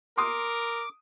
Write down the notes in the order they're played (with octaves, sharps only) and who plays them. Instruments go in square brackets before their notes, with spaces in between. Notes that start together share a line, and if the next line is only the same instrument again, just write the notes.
[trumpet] A#4 [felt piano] C6 D#6 [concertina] D6